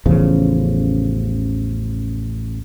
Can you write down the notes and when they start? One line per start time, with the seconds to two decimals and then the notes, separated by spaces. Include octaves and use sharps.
0.06 A1 E2 C#3 F3